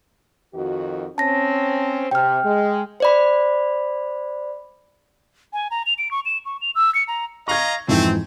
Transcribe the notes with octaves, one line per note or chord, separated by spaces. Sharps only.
F2 D#3 F#4
C4 C#4 A5 A#6
C3 G5 F6
G#3
C5 D5 B5
G#5
A#5
F7
D7
C#6
E7
C#6
F7
E6
C#7
A#5
D#5 F5 A#5 C#6 G#6
F2 G#2 E3 A3 C4